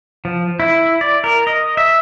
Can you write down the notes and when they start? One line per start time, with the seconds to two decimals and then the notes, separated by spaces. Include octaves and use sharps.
0.25 F3
0.60 E4
1.01 D5
1.24 A#4
1.47 D#5
1.77 E5